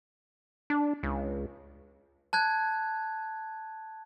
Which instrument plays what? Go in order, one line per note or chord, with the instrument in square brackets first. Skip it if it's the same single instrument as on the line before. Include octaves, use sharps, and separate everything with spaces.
[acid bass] D4
C#2
[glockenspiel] A5 F#6 G#6